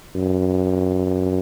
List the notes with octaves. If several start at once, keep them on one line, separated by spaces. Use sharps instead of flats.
F#2